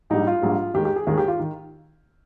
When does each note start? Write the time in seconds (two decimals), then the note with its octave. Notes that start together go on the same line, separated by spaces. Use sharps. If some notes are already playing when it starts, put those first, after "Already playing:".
0.10 A#1 G#2 G3 D#4
0.27 F4
0.42 A#1 G#2 G3
0.74 D#2 D#3 G#3 G4
0.85 G4
0.96 G#4
1.07 D#2 D#3 G#3 G#4
1.18 G4
1.28 F4
1.39 D#3